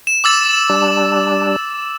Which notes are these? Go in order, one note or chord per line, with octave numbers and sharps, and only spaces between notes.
E7
D6 E6 A6
G3 D4